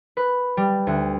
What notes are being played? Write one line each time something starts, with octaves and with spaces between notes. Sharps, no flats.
B4
G3
D2